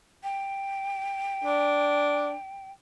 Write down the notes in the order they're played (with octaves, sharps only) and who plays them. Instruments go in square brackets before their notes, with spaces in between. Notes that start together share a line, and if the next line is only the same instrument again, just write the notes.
[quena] G5
[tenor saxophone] D4